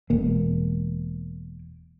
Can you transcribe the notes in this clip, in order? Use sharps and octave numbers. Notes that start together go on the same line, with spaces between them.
E1 A#3